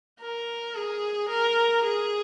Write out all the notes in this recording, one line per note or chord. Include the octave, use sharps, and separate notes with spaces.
A#4
G#4
A#4
G#4